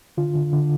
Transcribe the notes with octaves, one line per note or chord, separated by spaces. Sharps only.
D3 F4
D3
D3